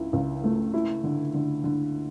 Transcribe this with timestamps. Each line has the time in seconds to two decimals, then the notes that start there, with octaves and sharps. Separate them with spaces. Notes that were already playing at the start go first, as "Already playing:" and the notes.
Already playing: C#2 E4
0.13 C#2
0.44 A3
0.74 E4
1.04 D3
1.34 D3
1.64 D3